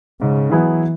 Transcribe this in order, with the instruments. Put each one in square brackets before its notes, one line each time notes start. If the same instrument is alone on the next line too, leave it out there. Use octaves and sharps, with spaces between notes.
[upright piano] G#2 [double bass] C#3
[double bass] E3 [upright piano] F#3 B3 E4 G#4